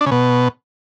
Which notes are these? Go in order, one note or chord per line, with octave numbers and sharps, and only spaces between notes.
D4
C#3
B2